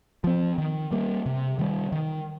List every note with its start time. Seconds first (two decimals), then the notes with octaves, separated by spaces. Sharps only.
0.24 F3 C4
0.58 D#3
0.92 G3 A#3
1.26 C3
1.59 D#3 G3
1.92 D#3